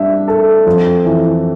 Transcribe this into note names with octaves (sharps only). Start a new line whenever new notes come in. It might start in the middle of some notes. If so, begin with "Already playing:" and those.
Already playing: G3 D4 E5
A4
F2
E3